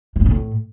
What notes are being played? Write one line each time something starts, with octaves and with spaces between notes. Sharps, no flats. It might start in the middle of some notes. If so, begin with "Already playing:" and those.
E3
G2
B2
A2